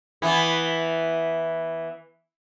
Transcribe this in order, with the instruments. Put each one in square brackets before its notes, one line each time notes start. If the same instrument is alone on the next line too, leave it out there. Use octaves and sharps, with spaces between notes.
[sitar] E3 B3